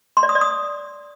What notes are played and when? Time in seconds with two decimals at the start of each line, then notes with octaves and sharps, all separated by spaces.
0.17 C6
0.23 D5
0.29 D#6
0.35 D5
0.41 D#6